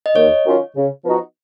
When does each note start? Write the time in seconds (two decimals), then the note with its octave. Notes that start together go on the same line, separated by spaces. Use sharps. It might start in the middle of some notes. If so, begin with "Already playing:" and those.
0.06 D#5
0.15 D#2 C#5
0.44 D#3 F#3 C#4 F4
0.75 C#3
1.05 F3 B3 D#4 F#4